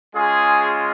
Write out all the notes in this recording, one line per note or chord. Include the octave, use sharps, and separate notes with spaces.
G#3 C#4 F4 G#4